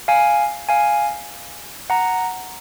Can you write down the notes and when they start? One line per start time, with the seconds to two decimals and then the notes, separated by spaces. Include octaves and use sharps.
0.08 F5 G#5
0.69 F5 G#5
1.90 F#5 A#5